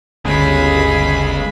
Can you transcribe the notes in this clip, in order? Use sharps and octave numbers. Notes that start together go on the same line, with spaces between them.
G1 D2 C#3 G#3 G#4 B5